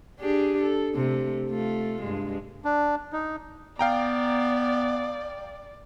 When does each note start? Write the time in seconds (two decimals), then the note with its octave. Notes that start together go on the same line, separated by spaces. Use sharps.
0.20 D4 G4 G#4
0.62 A4
0.95 C3 A3
1.50 A3 F4
2.02 G2 G#3
2.65 D4
3.13 D#4
3.79 B3 D5 F5 G5 A#5